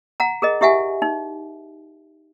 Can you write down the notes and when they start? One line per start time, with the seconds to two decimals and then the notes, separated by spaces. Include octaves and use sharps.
0.20 F#5 A#5
0.42 G#4 A#4 D#5
0.61 E4 G4 E5 F#5 G#5
1.02 D#4